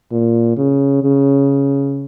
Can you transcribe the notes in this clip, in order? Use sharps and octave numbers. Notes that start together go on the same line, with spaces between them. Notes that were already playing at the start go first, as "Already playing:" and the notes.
A#2
C#3
C#3